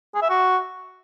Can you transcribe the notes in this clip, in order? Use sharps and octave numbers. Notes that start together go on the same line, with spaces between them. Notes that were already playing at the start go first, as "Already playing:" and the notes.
G#4
E5
F#4